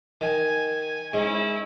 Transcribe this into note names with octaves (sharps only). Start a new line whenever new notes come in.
D#3 G#5
G#2 G#3 C#4 E4